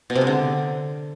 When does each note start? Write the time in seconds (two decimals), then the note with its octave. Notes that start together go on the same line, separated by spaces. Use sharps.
0.10 B2
0.15 C3
0.21 G#3
0.27 D3